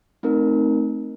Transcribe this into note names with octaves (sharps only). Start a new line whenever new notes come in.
A3 C4 D#4 A#4